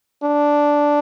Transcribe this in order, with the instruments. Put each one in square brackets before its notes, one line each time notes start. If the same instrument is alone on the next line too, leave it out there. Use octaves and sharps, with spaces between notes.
[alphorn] D4